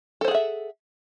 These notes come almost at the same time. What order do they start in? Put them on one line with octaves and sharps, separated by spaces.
A4 C5 G#4 F#5 E5